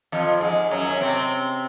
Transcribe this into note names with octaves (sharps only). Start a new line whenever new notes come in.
F2 F3
G#2 G#3
F#2 F#3
C#4
C3 C4